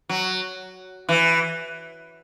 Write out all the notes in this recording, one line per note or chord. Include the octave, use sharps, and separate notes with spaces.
F#3
E3